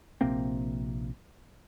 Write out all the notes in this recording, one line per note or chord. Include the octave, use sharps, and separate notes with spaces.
A#1 C3 A#3 C4